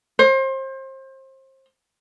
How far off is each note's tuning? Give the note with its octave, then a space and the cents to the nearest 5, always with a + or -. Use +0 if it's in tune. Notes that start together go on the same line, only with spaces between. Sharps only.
C5 +30